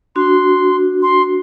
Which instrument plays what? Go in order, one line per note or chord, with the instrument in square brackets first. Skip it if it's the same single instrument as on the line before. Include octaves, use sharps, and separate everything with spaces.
[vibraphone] D4 F#4 [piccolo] C6
[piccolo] C6